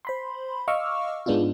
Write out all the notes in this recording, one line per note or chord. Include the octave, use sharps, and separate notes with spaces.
C5 B5 C6
D#5 F5 C#6 D6 E6 F6
G#2 G#3 B3 D4 D#4 F4